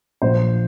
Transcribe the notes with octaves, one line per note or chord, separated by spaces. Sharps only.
A#1 A#2 F3 C5